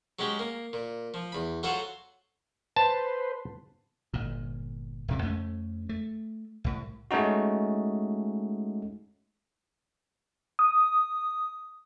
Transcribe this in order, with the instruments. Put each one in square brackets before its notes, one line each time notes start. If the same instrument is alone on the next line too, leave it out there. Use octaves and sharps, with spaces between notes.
[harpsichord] F#3 G#3 C#4 G4
A#3
A#2
F3
E2 B5
F#3 F4 F#4 A4 C5 F#5
[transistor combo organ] B4 C5 [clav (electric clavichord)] A5
[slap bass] G1 A#2
D1 C3 G3
F2 A3 A#3 C#4
A3
C2 A2
[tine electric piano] G#3 A3 C#4 D#4 F#4
[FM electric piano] D#6